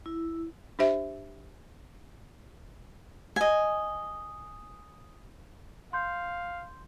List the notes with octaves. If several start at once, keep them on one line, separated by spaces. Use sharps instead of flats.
E4
D4 G4 C5 E5
D#5 G#5
F5 C6 G6